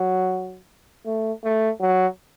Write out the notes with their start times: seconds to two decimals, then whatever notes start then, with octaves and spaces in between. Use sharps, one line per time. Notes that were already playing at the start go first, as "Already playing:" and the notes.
Already playing: F#3
1.05 A3
1.44 A3
1.80 F#3